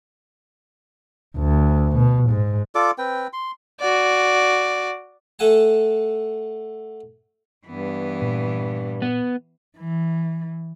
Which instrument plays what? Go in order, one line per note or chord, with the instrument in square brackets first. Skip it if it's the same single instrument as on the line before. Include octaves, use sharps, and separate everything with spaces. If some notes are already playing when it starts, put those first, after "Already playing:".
[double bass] D2
B2
G#2
[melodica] F4 A4 D5 D6
C4 B4 G5
C6
[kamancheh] F#4 D5
[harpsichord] A3 A4 F#5 G#5 A5
[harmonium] G2 [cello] E3 B3
[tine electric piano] A#2
[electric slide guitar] B3
[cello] E3